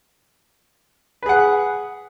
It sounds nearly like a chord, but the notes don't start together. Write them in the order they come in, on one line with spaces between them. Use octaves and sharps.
B4 G#4 F#5